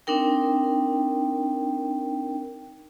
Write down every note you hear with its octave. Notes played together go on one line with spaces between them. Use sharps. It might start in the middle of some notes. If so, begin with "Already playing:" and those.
C4 D4 D#4 A#4 G5